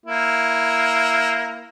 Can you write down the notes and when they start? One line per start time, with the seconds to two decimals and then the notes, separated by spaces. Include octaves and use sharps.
0.06 A#3 E4